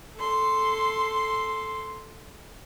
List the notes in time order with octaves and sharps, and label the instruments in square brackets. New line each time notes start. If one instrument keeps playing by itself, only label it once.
[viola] A4 C6